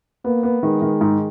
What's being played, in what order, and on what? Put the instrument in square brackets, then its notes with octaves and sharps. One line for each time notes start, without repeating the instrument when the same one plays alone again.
[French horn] A#3 [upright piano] B3
[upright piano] B3
[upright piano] D#3 [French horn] G#3
[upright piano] D#3
G#2